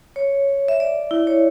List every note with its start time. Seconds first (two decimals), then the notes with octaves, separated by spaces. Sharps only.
0.16 C#5
0.68 E5
0.80 D5
1.11 E4
1.27 C#5